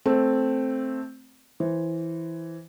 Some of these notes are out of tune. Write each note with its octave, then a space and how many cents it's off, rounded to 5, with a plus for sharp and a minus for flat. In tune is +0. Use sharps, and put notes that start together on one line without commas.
A3 +0 C4 +0
E3 +0 C5 +5